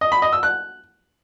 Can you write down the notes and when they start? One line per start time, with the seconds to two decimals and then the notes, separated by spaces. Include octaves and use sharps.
0.01 D#5
0.12 B5
0.22 D#5
0.33 E6
0.43 F#6